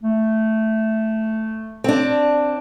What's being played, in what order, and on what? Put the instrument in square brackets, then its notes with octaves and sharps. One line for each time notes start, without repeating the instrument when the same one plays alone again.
[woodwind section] A3
[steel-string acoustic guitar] C4 D4